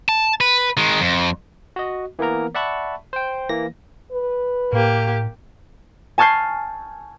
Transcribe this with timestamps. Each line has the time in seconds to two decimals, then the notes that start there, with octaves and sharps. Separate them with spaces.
0.09 A5
0.41 B4
0.77 D#3 G#3
1.01 F2
1.76 F#4 D#5
2.19 E3 A#3 B3 A#4 A#5
2.55 D5 E5 F#5 A5 B5 C#6
3.13 C5 G5
3.49 E3 A#3 A#6
4.12 B4
4.73 A2 A#3 G4
6.18 G#5 A5 C#6 F6 G6 C7